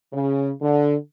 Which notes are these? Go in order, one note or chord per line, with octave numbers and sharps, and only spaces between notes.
C#3
D3